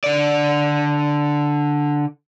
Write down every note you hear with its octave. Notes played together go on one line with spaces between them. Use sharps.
D3 D5